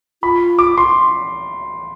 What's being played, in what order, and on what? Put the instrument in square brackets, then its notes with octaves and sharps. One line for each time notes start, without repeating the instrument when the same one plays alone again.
[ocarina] F4 [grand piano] B5
[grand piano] D6
C6